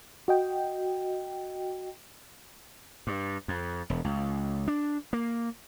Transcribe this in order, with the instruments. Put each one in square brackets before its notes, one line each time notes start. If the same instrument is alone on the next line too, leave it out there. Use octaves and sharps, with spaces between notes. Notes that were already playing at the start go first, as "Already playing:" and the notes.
[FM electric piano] F#4 D#5 G5
[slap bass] G2
F2
E1
C#2
D4
A#3